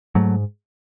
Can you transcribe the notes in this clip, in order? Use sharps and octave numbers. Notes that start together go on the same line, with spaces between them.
G#2 F#3 A3